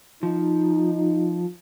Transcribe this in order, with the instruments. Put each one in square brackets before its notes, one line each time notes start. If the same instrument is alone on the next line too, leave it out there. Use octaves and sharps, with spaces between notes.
[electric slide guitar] F3 [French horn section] D#4